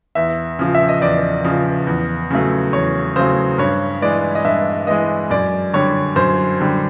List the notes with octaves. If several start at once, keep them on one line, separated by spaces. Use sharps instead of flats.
E2 E5
C#3 F3
E5
D#5
E2 D5
C#3 F3
E2
C#3 F#3 A3
E2 C#5
C#3 F#3 A3 C5
G2 C#5
E3 G#3 D5
D#5
G2 E5
E3 G#3 D#5
F#2 D5
D3 G3 C#5
F#2 C5
D3 G3